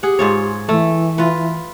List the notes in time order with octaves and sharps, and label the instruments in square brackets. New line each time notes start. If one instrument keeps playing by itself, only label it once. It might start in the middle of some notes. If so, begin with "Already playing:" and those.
[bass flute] G4 [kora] G#4 F#5
[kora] G#2 F4 C#5
[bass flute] E3 [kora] A3
[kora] F4 B4